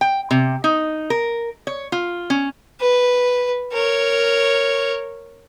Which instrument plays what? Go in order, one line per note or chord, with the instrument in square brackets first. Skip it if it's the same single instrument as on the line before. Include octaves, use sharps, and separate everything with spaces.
[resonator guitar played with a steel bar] G5
C3
D#4
A#4
C#5
F4
C#4
[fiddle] B4
A#4 C#5